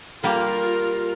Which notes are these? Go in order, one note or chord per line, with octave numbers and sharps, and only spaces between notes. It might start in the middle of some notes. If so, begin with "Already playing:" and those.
G3 A#3 F4 G4 A#4